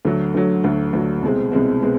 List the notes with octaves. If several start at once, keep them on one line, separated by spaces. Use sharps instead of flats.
D2 D3 F#3
D2 D3 F#3
D2 D3 F#3
D2 D3 F#3
C2 B2 G#3 C4
C2 B2 G#3 C4
B2 G#3 C4